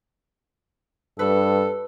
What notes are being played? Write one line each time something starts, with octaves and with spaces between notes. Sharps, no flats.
G2 A4 B4